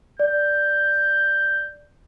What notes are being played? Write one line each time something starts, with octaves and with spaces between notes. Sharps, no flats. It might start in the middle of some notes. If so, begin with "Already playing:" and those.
D5 G6